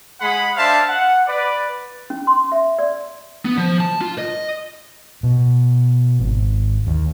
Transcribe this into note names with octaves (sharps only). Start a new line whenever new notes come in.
G#3 G#4 F#5 B5
D4 C5 E5 F5 A5
F#5
B4 D5
C#4
C6
E5
D5
B3
F3
A5
F4
D#5
B2
G#1
D#2